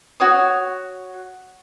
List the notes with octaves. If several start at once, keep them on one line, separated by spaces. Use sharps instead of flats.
F#4 C#5 D#6